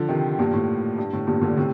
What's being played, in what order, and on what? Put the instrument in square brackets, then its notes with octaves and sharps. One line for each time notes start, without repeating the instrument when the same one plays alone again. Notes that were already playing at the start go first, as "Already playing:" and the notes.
Already playing: [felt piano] D3 F3
C3 D#3
G2 A#2
A2
G2
A2
G2 A#2
A#2 D3
A2 C3